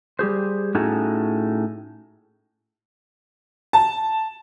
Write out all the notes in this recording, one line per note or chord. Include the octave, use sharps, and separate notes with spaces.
G3 G4 G#4 C5
A2 C#4 D#4 F#4 G#4 A4
A5